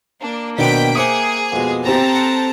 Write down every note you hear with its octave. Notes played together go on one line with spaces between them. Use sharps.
A#3 D4
B2 D#3 B3 C4 D4 G5 B6 D7
G#4 C5 E5 F#5 G5 D6 D#6
F2 B2 G#3
C4 G4 A4 C5 G5 A5 A#5
F#5